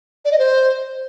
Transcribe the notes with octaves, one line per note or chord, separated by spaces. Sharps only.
D5
D#5
C5